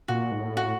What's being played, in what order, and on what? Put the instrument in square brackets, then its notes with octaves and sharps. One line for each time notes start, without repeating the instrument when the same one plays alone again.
[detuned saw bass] A#2 [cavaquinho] F#4
[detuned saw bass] G#2
A2
[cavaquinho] F#4